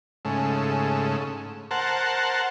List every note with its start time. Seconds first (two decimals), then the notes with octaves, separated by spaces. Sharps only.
0.25 G#2 C#3 A3
1.71 A#4 C5 F#5 A5